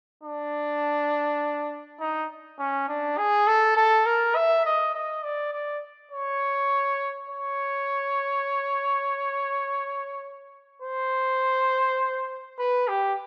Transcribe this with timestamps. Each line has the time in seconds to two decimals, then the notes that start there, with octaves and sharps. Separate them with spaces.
0.24 D4
2.00 D#4
2.59 C#4
2.88 D4
3.18 G#4
3.47 A4
3.77 A4
4.06 A#4
4.35 E5
4.65 D#5
4.95 D#5
5.23 D5
5.53 D5
6.11 C#5
7.29 C#5
10.82 C5
12.59 B4
12.88 G4